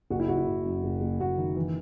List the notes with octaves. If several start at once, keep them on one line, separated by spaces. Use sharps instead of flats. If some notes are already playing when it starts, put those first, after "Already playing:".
F#1 F#4
E4
F#1 F#4
E4
F#1
F#2
F#1
F#1
F#1 F#4
D#3
E3